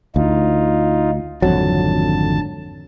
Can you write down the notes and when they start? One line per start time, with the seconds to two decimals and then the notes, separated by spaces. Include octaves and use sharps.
0.16 D2 D#4 F4
1.42 G#1 F2 D3 F#3 A5